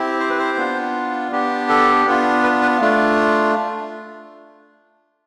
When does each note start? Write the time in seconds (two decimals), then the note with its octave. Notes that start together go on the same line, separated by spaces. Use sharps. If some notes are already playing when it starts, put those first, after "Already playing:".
Already playing: C4 E4 G4
0.20 C5
0.29 B4
0.39 C5
0.57 B3 D4 F4
1.32 B3 D4 G4
1.69 A4
2.07 B3 D4 F4
2.43 B4
2.62 B4
2.81 A3 D4 F4